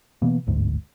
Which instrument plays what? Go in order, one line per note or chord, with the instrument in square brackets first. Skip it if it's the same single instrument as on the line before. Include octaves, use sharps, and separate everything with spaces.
[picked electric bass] B2 E3 A#3 B3
G1 D2 G#2